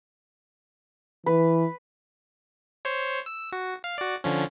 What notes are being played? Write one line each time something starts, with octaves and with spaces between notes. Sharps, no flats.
E3 B4
C5 C#5
E6
F#4
F5
F#4 D5
D3 F3 C#4